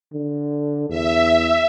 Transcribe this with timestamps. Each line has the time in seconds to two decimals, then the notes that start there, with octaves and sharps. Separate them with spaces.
0.13 D3
0.89 E2 E5